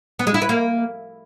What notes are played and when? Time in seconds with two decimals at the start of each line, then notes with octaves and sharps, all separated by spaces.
0.19 B3
0.27 G#3
0.34 E4
0.42 B4
0.49 A#3